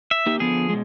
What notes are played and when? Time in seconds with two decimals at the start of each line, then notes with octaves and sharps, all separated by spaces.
0.11 E5
0.26 A#3 D#4 G4
0.40 D3 F3 B3 G#4
0.70 B2 G#3